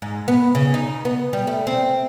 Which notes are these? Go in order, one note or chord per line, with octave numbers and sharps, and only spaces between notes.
G#2
B3
C#3
D#4
B3
G3
A3
C4